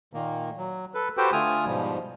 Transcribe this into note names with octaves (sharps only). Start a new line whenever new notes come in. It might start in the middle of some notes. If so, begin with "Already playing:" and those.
A#2 D#3 A#3
F#3
A4 B4
F#4 G4 A4 B4 C5 G5
D3 A3 F4 G#5 D#6 F6
G#2 B2 F3 G3